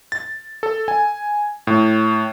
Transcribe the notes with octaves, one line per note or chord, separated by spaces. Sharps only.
A6
A4
G#5
A2